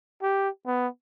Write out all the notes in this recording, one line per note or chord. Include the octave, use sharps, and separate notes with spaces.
G4
B3